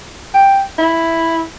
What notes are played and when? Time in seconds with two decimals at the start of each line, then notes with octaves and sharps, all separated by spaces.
0.34 G5
0.78 E4